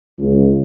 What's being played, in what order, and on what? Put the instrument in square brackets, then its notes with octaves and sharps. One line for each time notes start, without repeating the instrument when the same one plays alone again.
[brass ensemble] C#2